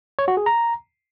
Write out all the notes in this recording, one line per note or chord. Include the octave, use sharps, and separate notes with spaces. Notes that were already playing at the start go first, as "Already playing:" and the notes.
C#5
F#4
G#4
A#5